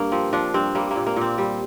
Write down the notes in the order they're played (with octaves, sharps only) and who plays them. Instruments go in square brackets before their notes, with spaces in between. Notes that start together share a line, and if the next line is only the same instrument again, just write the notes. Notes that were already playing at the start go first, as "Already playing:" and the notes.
Already playing: [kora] G2 A#3
F3 C4
F3 D4
G2 C4
G3 A#3
A#3
A#2
A#3
A#2 C4
G3